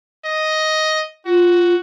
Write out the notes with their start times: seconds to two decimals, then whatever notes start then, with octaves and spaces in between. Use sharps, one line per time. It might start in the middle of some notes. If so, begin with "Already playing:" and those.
0.25 D#5
1.25 F4 F#4